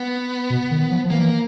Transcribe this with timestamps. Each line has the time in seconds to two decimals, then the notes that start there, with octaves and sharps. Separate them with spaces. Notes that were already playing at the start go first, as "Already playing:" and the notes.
Already playing: B3
0.50 B2
0.71 D#3
0.91 F3
1.05 F3
1.11 E3 A#3